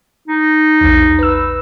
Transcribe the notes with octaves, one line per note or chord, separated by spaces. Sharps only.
D#4
A#1 E2
B4 E6